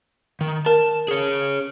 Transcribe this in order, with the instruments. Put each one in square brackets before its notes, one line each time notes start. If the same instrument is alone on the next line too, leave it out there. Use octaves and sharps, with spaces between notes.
[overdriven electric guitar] D#3
[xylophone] A#4 [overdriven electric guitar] A5
[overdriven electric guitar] G#4 C#5